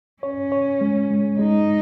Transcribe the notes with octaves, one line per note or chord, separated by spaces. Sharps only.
C#4 C#5
C#5
G#3
G#3
G#3 D#4